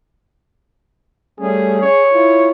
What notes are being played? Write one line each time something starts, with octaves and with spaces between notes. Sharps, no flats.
G3 A3 C#4 G#4
G#4 C#5
E4 F4